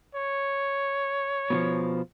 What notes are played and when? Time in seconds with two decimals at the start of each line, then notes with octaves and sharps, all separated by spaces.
0.15 C#5
1.50 B2 E3 F3